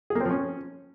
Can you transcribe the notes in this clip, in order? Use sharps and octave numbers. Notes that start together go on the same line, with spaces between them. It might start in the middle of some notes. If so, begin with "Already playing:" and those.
G#4
A#3
C4
F3
C#4